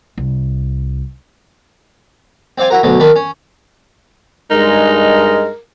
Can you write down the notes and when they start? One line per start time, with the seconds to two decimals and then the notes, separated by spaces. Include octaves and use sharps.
0.18 C2
2.58 C4 D5 F5 G#5
2.70 E4 F#4 A#4
2.83 D2 B2 F#3
3.00 D#3 D4 B4
3.16 C#4
4.51 G2 G#3 D#4 A#4